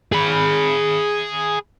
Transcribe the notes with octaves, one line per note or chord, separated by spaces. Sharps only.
G#4 B5